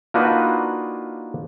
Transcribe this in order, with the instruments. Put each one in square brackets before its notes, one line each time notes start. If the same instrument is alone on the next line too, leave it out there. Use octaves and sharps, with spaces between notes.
[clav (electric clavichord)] A#3 D4 D#4 F4 F#4 B4